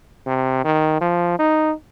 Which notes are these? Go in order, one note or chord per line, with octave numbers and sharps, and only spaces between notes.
C3
D#3
F3
D#4